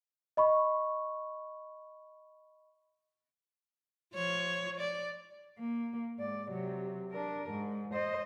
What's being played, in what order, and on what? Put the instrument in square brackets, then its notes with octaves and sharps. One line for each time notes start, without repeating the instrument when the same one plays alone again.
[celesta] D#5 B5 C#6
[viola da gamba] F3 C#5
D5
[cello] A#3
G#2 D5
C3 F#3
D4 A#4
G#2
C5 D#5